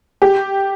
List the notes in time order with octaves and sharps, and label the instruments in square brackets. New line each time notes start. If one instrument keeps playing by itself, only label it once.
[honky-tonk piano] G4